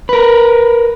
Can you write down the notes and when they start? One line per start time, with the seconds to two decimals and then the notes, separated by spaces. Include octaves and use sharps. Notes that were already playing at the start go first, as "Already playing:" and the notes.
0.09 A#4 B4